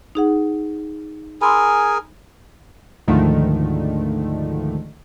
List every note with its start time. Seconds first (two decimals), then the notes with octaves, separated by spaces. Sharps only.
0.15 D#4 G#4 F#5
1.42 G#4 A#4 G#5 B5 C6 E6
3.08 D2 G#2 D3 D#3 F3 A3